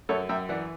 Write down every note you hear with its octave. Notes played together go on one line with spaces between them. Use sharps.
F#2 A4 C#5
F#2 E5 G5
E3 D5 F#5